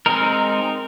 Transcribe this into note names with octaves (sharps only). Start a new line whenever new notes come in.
G#3 C4 D#4 A#4